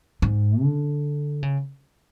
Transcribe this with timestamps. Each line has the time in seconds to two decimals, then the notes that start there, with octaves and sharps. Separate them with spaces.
0.22 G#2
0.62 D3
1.43 C#3